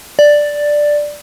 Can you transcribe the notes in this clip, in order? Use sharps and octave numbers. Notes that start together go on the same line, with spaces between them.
D5